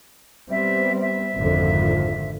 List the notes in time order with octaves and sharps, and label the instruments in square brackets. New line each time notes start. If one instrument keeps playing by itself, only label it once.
[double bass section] G3 B3 C4 [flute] E5
[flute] E5
[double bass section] G#1 F2 D3